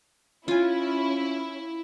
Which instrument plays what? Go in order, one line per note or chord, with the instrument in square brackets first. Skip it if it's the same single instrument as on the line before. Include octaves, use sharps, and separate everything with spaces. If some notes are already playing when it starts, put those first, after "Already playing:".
[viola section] C#4 [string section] E4 [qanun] F4 G#5